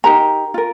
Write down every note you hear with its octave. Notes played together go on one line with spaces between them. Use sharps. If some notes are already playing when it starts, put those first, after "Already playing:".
D#4 G4 A#4 A#5
F4 A#4